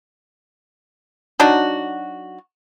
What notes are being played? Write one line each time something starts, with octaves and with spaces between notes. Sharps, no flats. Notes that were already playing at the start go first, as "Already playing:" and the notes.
F#3 D4 D#4 F#4